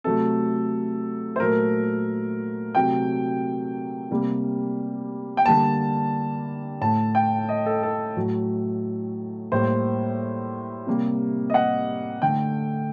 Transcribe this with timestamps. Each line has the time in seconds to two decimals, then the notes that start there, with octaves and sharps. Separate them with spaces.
0.04 C3 F#3 A3 A4
1.36 C5
1.40 A#2 F#3 A3 A#4
2.75 C3 F#3 A3 G5
4.11 C3 G3 A#3
5.37 G5
5.46 D3 G3 A#3 A5
6.81 A2 A3 A5
7.15 G5
7.49 D#5
7.66 A4
7.83 A4
8.16 A2 F#3 A3
9.52 A2 G3 A#3 C5
10.87 C3 G3 A#3
11.50 D#5
11.54 F#5
12.22 D3 A3 G5